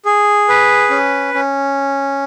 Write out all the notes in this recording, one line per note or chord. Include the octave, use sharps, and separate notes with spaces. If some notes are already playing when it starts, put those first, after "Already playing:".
G#4
B4
C#4
C#4